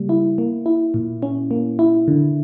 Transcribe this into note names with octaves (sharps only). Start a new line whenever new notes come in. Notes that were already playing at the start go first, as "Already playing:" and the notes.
Already playing: C#3 G3 A#3
E4
A#3
E4
A#2
C#4
A#3
E4
D3